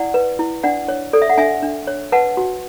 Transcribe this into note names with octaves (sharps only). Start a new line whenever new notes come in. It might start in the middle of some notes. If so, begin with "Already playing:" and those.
Already playing: E4 D5 F#5
B4
E4
D4 D5 F#5
C#5
A4 D5
E5
F#5
D4 E5 G#5
D4
C#5
B4 F#5 A5
F#4